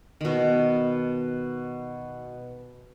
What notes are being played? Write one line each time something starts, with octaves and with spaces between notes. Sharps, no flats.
B2 D#3